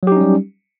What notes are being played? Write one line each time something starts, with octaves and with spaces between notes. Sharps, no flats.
F#3 G3 C#4 D#4 G4